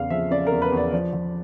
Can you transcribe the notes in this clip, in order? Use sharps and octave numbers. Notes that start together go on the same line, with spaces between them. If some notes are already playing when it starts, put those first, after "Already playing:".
Already playing: E2 C#3 F5
F3 E5
C#3 D5
A#4
E2
B4
E2
D5
F3 D5
F3